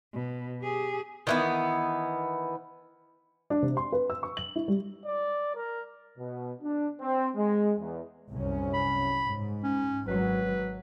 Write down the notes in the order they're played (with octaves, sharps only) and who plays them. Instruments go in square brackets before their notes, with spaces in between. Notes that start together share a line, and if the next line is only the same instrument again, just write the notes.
[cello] B2
G4 G#4
[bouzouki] D#3 E3 B3
[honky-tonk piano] D4
C3
C6
B4
E6
C#6
F#7
E4
G3
[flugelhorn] D5
A#4
[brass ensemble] B2
D4
C4
G#3
E2
[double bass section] C2 F#2 C#4
[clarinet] B5
[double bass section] G#2
[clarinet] C#4
[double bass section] G#1 F#3 [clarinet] B4